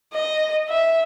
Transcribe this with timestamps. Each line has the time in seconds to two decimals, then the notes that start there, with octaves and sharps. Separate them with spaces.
0.13 D#5
0.69 E5